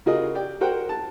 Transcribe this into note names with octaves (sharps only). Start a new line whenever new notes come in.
C#3 F4 F#4 G#4 A#4 D#5
G4 D5 G5
F#4 A#4 C5 F#5 G5
A5